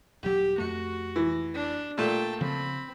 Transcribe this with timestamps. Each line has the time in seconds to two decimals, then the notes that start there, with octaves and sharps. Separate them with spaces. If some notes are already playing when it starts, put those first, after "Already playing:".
0.23 D#1 F#3 G4
0.58 F2 A3 F#4
1.16 E3
1.54 D4
1.98 A#2 A3 G5 A5
2.41 C#3 F3 C4 B5